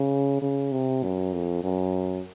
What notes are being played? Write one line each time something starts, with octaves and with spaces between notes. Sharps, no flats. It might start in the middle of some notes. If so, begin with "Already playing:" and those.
Already playing: C#3
C#3
C3
F#2
F2
F#2